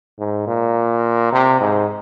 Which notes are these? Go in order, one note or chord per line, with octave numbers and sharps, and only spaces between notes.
G#2
A#2
C3
G#2